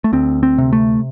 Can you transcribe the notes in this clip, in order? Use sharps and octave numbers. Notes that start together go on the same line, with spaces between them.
A3
D2 C4
C4
C3
A3